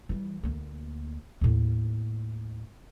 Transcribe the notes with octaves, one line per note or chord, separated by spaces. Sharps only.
E3 G3
D2 A#3
D#2 A2